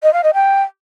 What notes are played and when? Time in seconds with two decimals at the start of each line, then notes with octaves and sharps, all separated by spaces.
0.03 D#5
0.13 F5
0.23 D#5
0.34 G5